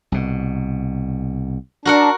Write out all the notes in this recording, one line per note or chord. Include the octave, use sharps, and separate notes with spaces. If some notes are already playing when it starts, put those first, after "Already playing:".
C2 B2
D4 F#4 A#4 F#5